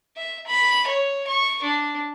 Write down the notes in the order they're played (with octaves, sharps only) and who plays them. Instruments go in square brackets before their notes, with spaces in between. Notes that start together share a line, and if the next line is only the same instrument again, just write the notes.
[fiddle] E5
B5
C#5
C#6
D4